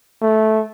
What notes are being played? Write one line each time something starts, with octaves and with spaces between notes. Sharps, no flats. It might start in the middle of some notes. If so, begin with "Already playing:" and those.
A3